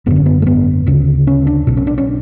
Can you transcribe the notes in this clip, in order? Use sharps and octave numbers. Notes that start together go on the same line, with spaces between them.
G#1 F#2 D3 B3
C#4
B3
A3
B3
D2 C#3
C#4
D4
B1 B2
C#4
D4
C#4